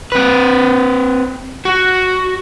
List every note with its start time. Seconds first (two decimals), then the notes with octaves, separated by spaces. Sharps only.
0.12 C4 B4
1.65 F#4